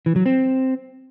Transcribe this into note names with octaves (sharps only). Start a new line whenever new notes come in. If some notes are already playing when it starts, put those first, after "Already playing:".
E3
F#3
C4